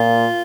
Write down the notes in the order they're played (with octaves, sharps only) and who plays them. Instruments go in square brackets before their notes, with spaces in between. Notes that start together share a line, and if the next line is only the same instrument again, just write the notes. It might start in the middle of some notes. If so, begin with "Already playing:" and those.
Already playing: [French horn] A#2 [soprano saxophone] F4